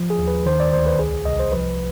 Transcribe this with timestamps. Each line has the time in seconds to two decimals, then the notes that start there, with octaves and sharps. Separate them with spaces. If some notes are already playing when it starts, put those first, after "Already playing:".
Already playing: F3
0.10 G#4
0.19 D#2
0.28 B4
0.46 D#3 C5
0.60 D5
0.73 D2 C5
0.87 B4
0.99 C2 G#4
1.25 C2 D#5
1.39 C5
1.52 F3 B4